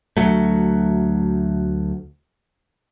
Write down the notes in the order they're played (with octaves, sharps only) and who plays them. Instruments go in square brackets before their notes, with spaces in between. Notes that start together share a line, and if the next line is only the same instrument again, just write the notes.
[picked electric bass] D2 F#3 A3